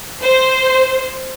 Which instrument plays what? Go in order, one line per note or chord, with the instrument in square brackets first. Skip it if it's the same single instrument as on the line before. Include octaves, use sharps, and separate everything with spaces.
[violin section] C5